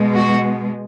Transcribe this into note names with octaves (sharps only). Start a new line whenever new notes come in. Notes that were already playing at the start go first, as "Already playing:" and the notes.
Already playing: B2 G#3
F#4